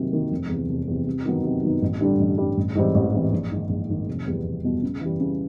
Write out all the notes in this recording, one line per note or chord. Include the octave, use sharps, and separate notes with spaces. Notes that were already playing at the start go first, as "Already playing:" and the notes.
Already playing: C3 D#3 F#3 A#3
D#3 F#3 A#3
F1
E2 C3
F1
E2 C3
C3
D#3 F#3 B3 D#4
C3
D#3 F#3 B3 D#4
A1
G2 D3 G3
A1
G2 D3 G3
A1
G#2 E3 G3 C4
A1
G#2 E3 G3 C4
A#1
G#2 D#3
A#1
G#2 D#3
F1
E2 B2 G3 B3
F1
E2 B2 G3 B3
C#3
E3 G3
C#3